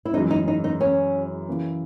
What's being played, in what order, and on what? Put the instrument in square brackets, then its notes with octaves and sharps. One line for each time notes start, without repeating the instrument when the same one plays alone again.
[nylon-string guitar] E4
[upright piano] F#2 E3 G#3 C#4 [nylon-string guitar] D#4
[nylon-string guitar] D#4
D#4
D#4
C#4
[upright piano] C#3 E3 A#3 C#4